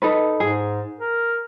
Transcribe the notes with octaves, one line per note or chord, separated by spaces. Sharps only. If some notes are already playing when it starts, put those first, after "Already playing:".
D#4 A4 B4
G#2 G#4
A#4